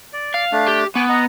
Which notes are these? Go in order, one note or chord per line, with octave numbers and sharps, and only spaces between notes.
D5
F5
A3 D4
G4
B3 G#5 C#6 D6
D#5 F#5 A#5